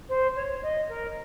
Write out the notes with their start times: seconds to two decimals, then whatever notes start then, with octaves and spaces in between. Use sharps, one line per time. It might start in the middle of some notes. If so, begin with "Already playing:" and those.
0.09 C5
0.36 C#5
0.63 D#5
0.89 A#4